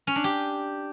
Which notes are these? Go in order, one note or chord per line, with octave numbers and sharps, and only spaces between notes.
C#4
D4
G4